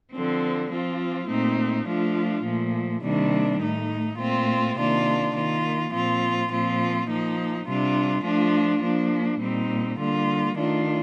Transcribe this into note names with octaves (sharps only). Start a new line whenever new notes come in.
D3 F3 C4
F3 C4 F4
A#2 A3 C4 D#4
F3 A3 D4 F4
A#2 F3 A3
C3 D#3 G3 A#3 D4
A2 A3 D#4
A#2 A3 C4 F4
C3 D#3 A#3 D4 F4
D#3 A#3 F4
A#2 F3 C4 F4
A#2 F3 C4 F4
F3 A#3 D#4
C3 G3 D4 F4
F3 A3 D4 F4
F3 A#3 D4
A#2 G3 C4 D#4
D3 G3 A#3 F4
D#3 A3 D4 F4